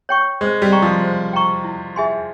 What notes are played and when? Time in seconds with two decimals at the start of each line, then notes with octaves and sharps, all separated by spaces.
0.09 C#5 G5 C#6
0.41 G#3 C5
0.62 G3
0.72 G5 A#5 C#6
0.82 F3
1.03 C5
1.33 G5 A#5 C#6
1.64 E4
1.96 G#4 E5 G#5 C6